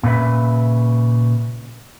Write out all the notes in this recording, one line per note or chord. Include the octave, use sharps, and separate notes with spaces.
A#2 C#3 B4 E5